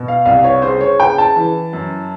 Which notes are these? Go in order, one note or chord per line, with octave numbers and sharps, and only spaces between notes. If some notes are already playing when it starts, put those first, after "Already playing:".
Already playing: B2
F5
C2 F5
C#5
C#3 C5
C#5
C#3 G5
A5
E3
F#2